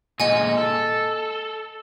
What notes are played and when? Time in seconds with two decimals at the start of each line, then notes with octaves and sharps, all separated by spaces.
0.20 A#2 G#3 D#5 F#5 G#5
0.58 A4